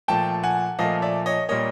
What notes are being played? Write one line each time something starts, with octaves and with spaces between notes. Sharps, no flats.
A#2 F3 A3 G5 A5
F#5 G#5
A#2 F3 A3 D#5 F5
D5 E5
C#5 D#5
A#2 G3 A#3 C#5 D#5